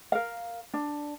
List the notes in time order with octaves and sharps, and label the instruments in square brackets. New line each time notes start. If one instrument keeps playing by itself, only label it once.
[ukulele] A#4 F5
D4